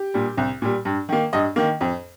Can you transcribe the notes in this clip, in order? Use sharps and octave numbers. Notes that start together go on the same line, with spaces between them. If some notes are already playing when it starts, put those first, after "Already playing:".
Already playing: G4
A#2 G3
C2
A#2 G3
G2
D#3 A#3
G2 D#5
D#3 A#3
F2